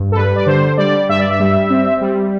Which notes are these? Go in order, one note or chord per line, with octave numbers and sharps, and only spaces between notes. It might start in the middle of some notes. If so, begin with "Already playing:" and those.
Already playing: G2
A4
G3 B4
D5
D3 C5
G3 D5
G2 E5
D5
E5
G3
C4
G3